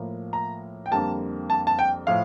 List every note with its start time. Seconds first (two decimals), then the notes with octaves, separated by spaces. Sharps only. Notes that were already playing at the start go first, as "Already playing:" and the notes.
Already playing: A2 F3 A#3
0.33 A#5
0.86 G5
0.91 F2 D3 G3 A#3 A5
1.50 A5
1.67 A5
1.79 G5
2.07 A2 F3 F5